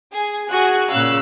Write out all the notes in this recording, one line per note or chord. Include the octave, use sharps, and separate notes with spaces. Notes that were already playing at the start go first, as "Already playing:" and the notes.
G#4
F#4 G#4 G#5 F#6
A#2 C#3 F5 E6 F#6